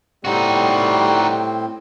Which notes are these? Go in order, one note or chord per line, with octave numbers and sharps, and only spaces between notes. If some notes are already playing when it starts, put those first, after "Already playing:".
A2 G3 C4 D#4 F#4